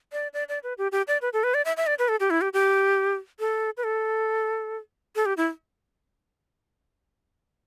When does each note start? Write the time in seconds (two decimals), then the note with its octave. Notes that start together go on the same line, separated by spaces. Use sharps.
0.12 D5
0.34 D5
0.49 D5
0.63 B4
0.78 G4
0.92 G4
1.08 D5
1.22 B4
1.33 A4
1.44 B4
1.54 D5
1.65 E5
1.77 E5
1.87 D5
1.99 B4
2.08 A4
2.20 G4
2.30 E4
2.41 G4
2.53 G4
3.40 A4
3.77 B4
3.84 A4
5.16 A4
5.26 G4
5.37 E4